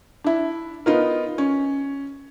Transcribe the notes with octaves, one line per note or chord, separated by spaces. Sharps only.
D4 E4
B3 D#4 F4 A#4
C#4